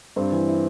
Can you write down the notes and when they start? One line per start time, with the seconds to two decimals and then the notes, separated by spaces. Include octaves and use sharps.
0.16 G2 C4
0.32 E3
0.47 E4